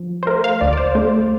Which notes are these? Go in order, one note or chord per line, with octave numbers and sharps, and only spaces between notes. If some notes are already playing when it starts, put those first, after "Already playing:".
Already playing: F3
C5
A3 A#4
F5
D2 D5
D5
C5
A3 C5